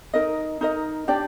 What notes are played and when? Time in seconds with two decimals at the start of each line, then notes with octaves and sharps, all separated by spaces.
0.14 D#4 A#4 D#5
0.61 D#4 A#4 D#5
1.08 D4 G4 D5 G5